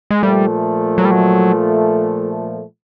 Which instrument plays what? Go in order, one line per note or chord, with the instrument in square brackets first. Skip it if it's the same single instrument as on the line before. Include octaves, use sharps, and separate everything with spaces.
[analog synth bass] G#3
[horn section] A#2 F3 A3 [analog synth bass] G3
[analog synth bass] F#3
G3
F#3